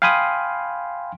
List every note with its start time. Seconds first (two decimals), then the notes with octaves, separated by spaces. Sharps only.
0.02 F5 G5 G#5 B5 C6 D#6